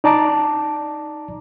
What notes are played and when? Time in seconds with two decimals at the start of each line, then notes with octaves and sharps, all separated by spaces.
0.04 D#4 D5 A5 A#5 D6